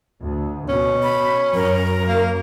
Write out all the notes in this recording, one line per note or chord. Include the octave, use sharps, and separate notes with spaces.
D2
B2 C#4
B5
F#2 A#4
A#3